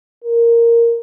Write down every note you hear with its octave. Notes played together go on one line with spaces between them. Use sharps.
A#4